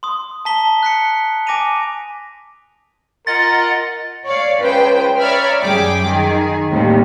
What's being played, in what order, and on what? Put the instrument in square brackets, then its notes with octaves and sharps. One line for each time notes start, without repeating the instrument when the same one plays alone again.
[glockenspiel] C6 D#6
A5 A#5 B6 G7
F#6 B6 C#7
G#5 D6 A#6 C#7 D#7 F7
[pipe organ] F4 D#5 F#5 [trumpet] A#4 [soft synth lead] A6
[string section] C#5 D5 F5
C#2 B4 C5 G5
C#5 D5 E5 A#5 B5 F6
F#2 G3 G#4 G5 D6
D#3 G#4
A1 D#2 A2 C3 G3